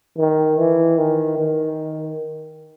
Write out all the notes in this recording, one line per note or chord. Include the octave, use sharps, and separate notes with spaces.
D#3
E3
D#3
D#3